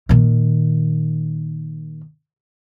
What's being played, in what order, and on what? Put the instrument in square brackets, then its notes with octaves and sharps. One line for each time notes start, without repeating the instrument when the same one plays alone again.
[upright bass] A#2 D#3